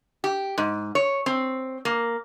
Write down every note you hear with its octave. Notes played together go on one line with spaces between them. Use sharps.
G4
G#2
C#5
C4
A#3